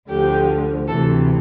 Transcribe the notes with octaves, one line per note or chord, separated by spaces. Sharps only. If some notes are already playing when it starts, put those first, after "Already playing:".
D2 D3 F3 G4
D2 C3 E3 A4